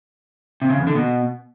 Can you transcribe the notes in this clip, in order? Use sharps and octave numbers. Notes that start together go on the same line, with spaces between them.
C3
C#3
E2
D3
B2